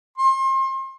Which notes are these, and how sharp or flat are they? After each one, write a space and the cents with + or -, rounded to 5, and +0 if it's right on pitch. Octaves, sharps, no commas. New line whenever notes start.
C6 +35